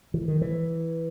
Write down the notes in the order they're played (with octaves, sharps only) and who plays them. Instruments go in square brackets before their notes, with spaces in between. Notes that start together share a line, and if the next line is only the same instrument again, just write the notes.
[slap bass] E3
D#3
E3